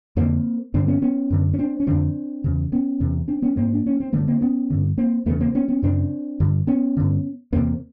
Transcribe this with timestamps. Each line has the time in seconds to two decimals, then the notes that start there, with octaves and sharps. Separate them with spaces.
0.17 F2 D3 A#3 C4
0.74 G2 D3 C4 D4
0.87 B3 C#4
1.02 B3 C#4
1.30 F#2 D3
1.53 C#4
1.59 C4 D4
1.80 C#4
1.87 F2 D3 C4 D4
2.44 E2 C#3
2.72 B3 C#4
3.00 E2 C3
3.28 C4 D4
3.42 B3 C#4
3.56 G#2 A#3 C4
3.73 D4
3.86 C#4
4.00 C4
4.13 G2 D3 A3 B3
4.28 A#3 C4
4.41 B3 C#4
4.70 G2 D3
4.98 A#3 C4
5.26 E2 C#3 A3 B3
5.40 A#3 C4
5.55 B3 C#4
5.68 B3 C#4
5.82 F#2 C#3 C4 D4
6.40 G2 D3
6.67 B3 C#4
6.97 G2 D3
7.53 E2 C3 A#3 C4